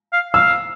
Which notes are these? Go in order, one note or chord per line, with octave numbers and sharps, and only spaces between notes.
F5
F5 E6